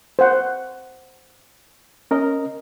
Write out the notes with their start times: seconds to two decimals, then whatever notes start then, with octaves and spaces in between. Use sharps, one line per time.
0.19 C5 F#5
2.11 C#4 A#4 D#5